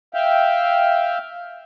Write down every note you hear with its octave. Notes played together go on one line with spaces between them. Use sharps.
E5 F5 G5